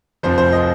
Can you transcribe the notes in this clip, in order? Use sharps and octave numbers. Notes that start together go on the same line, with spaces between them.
F1 F2 F3 C5
C5
D#5